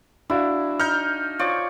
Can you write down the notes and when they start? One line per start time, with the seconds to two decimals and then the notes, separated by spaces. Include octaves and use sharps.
0.30 D4 E4 F#4 F5
0.80 D#4 F6 G6
1.39 F3 C#5 D5